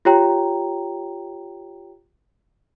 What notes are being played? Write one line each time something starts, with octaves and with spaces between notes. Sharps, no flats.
F4 G4 C#5 G5 A#5